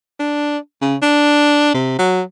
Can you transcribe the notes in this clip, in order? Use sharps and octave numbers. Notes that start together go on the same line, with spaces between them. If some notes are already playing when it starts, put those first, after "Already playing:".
D4
C#3
D4
C3
F#3